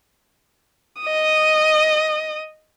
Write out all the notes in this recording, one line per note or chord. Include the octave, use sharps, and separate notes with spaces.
D#5 D#6